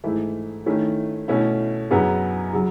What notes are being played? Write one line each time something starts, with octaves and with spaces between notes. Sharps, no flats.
G#2 E3 A3 E4
D#3 A3 C#4 E4
B2 A3 C#4 E4
F#2 C#3 F#3 B3
C#3 F#3